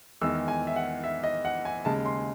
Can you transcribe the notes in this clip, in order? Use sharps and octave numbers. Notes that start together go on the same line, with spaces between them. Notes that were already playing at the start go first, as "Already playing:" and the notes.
E2 D#3 G#3 E6
G#5
E5
F#5
E5
D#5
F#5
G#5
D#2 C#3 G#3 A5
C6